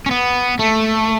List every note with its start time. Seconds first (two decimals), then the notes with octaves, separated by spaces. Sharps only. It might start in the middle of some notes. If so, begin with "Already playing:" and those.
0.06 C#4
0.11 B3
0.59 A3